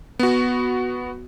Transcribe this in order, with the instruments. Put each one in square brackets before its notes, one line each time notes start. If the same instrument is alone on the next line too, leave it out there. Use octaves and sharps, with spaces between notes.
[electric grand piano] B3 F#4